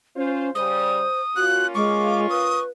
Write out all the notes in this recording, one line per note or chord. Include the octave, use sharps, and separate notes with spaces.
C#4 F4 C5
C#3 G3 C5 D#6
A#3 C#4 F4 F#4 F#6
G#3 C#6 D6
B4 D#6